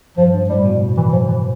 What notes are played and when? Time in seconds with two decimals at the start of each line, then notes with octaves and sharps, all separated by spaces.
0.17 G2 F3
0.34 G2
0.49 A2 G3
0.65 B2
0.97 E3
1.12 F3
1.28 E3